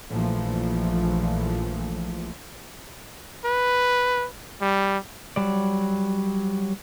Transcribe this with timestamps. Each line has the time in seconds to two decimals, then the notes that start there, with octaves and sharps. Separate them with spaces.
0.11 A#1 A#2 E3 F3 A3
3.45 B4
4.62 G3
5.36 F#3 G3 D5